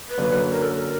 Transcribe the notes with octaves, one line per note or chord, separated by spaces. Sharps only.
B4
F#2 D3 F#3 A#3 C#4
A#4
A4
A#4